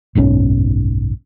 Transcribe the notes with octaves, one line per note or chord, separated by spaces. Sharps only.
F#1 B1 G#2 C#4